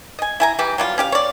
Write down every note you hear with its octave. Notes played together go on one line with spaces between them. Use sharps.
D#5 G#5
E4 G#5 A#5
E3 G3 G4
F#3 G3 F4
C#4 G4 F5
C#5 D5